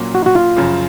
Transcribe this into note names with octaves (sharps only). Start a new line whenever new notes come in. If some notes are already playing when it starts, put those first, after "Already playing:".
Already playing: A#2 F#3 A#3 C#4
F#4
F#4
F4
F#2 C#3 F3